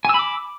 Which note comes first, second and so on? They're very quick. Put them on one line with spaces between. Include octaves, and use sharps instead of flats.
G#5 E6 B5 D6